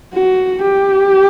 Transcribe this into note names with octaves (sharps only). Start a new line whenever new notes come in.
F#4
G4